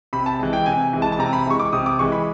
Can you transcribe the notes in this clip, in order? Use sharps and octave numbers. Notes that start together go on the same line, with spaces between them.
C3 B5
A5
E3 G#3
G5
C3 G#5
E3 G#3
A5
A5
C3 A#5
B5
E3 G#3 C#6
D6
C3 D#6
D6
E3 G#3 C#6
B5